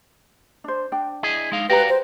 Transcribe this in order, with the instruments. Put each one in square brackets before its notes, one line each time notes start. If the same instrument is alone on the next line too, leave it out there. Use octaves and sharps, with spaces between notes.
[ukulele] D4 C5
D4 G5
[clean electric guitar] E4 G#4 D#5
G#3 D#4 F5
[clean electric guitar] F#4 D5 F5 [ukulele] G4 A#5 [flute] B4
[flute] C5